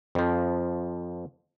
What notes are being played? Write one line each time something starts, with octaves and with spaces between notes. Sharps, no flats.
F2 F3